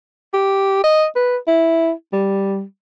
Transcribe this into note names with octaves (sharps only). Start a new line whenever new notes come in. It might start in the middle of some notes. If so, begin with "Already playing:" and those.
G4
D#5
B4
E4
G3